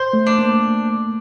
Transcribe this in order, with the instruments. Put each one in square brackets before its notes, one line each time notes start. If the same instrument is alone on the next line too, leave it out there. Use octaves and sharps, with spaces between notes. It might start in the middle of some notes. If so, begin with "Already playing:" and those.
Already playing: [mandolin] C5
[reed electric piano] A3
[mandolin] D4
[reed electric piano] A#3